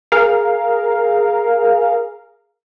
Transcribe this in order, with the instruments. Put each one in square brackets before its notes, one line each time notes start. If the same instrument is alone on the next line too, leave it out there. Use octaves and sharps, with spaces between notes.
[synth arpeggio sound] G#4 A#4 F5